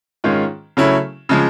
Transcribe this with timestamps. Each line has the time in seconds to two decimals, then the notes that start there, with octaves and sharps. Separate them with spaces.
0.24 G#2 D#3 G#3 C#4 F4
0.77 C#3 F#3 A3 C#4 E4
1.29 C#3 F3 G#3